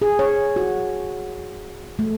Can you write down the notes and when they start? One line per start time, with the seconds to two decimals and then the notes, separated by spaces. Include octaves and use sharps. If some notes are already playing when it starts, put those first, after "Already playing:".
0.02 G#4
0.19 C#5
0.56 F#4
1.99 A3